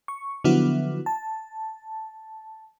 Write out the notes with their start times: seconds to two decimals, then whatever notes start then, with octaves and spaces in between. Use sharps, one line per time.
0.08 C#6
0.44 D3 F3 F#3 B3 E4 F#4
1.06 A5